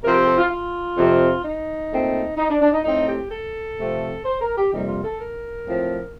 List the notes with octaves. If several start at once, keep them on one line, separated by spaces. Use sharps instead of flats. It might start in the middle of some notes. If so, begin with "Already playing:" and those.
C3 F3 C4 A#4
G4
A4
F4
F4
F2 C3 F3 C4
D#4
A#2 A3 C4
D#4
D4
D4
D#4
A2 A3 C4 D#4
G4
A4
C3 F3 A3 C4
C5
A#4
G4
F2 C3 G3 A#3 D#4
F4
A4
A#4
A2 F3 C4